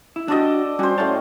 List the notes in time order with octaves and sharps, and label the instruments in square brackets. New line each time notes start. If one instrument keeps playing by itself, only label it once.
[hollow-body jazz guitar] E4
[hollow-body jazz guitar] D4 F#4 G4 [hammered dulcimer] A4 D5 D#5
[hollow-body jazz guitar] G3 C#4 F#4 [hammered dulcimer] G4 C5
[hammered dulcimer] A2 C#4 F#5 [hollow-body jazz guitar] C#5 D5 A5